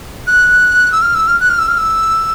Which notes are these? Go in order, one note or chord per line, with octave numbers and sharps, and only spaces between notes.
F#6
E6
F6
E6
F6
F#6
F6
E6
F6
E6